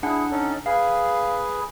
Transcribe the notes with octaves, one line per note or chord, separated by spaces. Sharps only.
D4 E4 G#4 F#5
C#4 D#4 A4
G#4 B4 F5